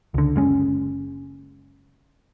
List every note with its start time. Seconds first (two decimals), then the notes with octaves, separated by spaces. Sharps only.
0.14 C#2 D3
0.36 F#1 G#3 C#4